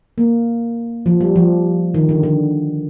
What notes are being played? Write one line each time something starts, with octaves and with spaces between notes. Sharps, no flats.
A#3
F3
G3
F3
D#3
D3
D3